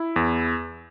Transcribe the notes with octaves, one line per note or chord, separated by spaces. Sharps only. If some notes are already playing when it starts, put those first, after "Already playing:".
Already playing: E4
E2